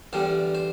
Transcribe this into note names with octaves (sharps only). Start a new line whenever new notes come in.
E2 D3 G3 C5
C5